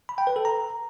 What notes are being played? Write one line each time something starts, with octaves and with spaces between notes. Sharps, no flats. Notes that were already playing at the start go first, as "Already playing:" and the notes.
B5
G5
B4
A4
A#5